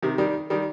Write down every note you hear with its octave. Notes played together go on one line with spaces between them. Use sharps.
C3 D#3
D#3 G3
D#3 G3